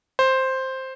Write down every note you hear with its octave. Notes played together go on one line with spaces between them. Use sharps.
C5